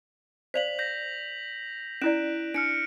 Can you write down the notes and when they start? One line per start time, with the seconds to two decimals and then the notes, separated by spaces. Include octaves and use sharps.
0.54 C5 D5 F5 B6 F7 F#7
0.79 G6 A#6 B6
2.02 C#4 E4 D5 F#6 D7 E7
2.54 D4 F6 C#7 D7